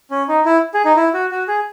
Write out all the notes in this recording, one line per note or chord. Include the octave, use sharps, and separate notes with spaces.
C#4
D#4
E4
G#4
D#4
E4
F#4
F#4
G#4